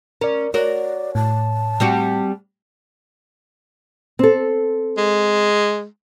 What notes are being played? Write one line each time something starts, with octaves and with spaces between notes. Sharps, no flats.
C#4 A#4 D5
F#4 A#4 C#5 D5
A2 A5
G3 C4 F#4
C4 A4
G#3